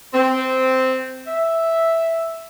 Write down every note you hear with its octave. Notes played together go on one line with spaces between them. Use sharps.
C4
E5